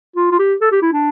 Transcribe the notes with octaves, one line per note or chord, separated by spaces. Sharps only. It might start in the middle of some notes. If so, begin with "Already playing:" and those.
F4
F4
G4
A4
G4
E4
D4